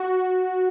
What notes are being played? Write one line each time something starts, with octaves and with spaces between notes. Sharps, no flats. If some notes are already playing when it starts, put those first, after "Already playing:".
Already playing: F#4